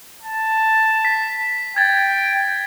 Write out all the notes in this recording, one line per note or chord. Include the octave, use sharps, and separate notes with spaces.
A5
B6
G5 G#6 A6